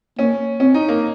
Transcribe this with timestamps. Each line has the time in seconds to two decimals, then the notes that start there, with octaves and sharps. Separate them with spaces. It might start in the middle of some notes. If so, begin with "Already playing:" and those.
0.19 A#3 C#4
0.60 C4 C#4
0.74 D#4
0.88 A#3